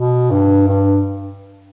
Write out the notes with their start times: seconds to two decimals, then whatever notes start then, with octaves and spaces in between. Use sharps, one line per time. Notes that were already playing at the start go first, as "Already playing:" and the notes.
Already playing: B2
0.30 G2
0.68 G2